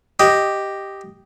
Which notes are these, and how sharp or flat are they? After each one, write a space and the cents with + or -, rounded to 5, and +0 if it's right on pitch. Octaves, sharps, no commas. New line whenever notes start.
G4 +0 D#5 +0